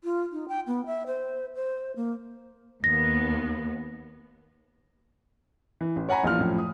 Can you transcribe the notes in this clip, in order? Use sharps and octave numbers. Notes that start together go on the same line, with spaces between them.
F4
D#4
G5
B3
E5
C5
C5
A#3
D#2 B3 A#6
E3
A1
C#5 F#5 G#5 A#5 B5
A#1 A#2 E3 F4 F6
F#2 A2 F3
D#6